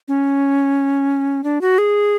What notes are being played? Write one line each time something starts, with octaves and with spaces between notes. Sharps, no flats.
C#4
D4
F#4
G#4